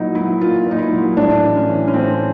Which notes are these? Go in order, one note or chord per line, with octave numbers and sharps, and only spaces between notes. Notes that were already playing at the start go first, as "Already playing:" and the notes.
Already playing: A#2 F#3 D#4 E4
F#3 E4
A#2 F4
A#2 D#4
E4
F#3
A2 D4
E3
C#4
E3
C#4
A2 C4